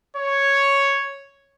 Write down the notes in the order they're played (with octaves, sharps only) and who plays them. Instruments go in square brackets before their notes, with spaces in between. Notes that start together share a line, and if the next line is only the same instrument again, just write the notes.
[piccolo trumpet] C#5